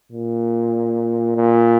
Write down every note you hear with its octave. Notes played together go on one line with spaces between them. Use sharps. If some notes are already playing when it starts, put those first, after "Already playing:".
A#2
A#2